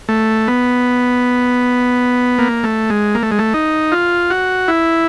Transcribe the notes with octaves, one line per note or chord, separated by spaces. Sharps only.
A3
B3
A#3
A3
G#3
A#3
A3
G#3
A3
D#4
F4
F#4
E4